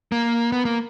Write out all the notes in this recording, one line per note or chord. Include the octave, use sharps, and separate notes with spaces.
A#3
B3
A#3